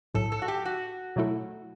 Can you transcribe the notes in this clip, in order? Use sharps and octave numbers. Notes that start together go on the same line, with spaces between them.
B1 A2 F#3 A4
A4
F#4
G4
F#4
B2 F#3 A3 E4 A4